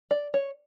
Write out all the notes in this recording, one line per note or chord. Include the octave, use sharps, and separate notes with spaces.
D5
C#5